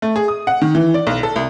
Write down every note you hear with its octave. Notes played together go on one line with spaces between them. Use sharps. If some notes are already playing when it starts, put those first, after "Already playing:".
A3
G#4
D#6
F#5
D#3
E3
D5
B1
A4
C2